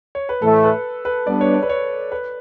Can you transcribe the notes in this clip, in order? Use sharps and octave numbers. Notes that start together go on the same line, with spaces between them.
C#5
B4
A2 E3 A3 A4
B4
B4
G3 B3 D4 D5
C#5
D5
B4
C#5
B4